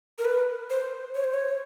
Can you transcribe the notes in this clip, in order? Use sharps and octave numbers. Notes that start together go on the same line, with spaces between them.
A#4
B4
C5
C#5
C5
C#5